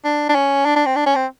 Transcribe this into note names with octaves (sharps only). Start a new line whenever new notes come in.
D4
D4
C#4
D4
D4
C4
D4
C#4
C4